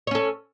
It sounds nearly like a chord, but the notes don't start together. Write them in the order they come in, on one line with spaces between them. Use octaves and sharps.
C#5 C#4 A4